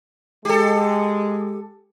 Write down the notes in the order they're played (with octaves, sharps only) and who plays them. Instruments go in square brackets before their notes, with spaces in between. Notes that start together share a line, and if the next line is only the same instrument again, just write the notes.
[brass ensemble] G#3 [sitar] G4 A4